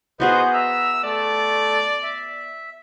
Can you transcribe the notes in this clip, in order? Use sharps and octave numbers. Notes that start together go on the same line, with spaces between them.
B3 F#4 G#4 B4 C5 D#5 G6
E5 A#5 E6
A3 D5
E5